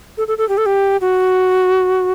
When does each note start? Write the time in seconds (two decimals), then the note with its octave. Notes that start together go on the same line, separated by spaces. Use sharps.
0.18 A4
0.28 A4
0.38 A4
0.49 G4
0.58 A4
0.66 G4
1.01 F#4